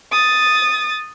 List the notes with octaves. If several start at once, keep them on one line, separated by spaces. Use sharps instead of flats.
D#6 A6